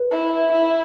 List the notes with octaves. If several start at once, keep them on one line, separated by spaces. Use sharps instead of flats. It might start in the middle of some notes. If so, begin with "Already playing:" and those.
Already playing: B4
E4
E4